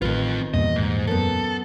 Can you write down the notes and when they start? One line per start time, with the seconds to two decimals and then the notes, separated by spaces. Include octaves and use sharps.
0.02 A1 D#3 C4 F4 B4
0.54 E2 G2 A#2 D#5
0.76 G#2
1.07 F#2 B3 A4